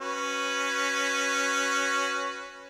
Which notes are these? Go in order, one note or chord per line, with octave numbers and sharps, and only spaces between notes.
C#4 F#4 B4